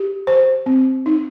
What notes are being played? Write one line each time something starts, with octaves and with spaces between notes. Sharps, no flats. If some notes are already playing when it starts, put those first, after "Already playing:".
Already playing: G4
C5
C4
D#4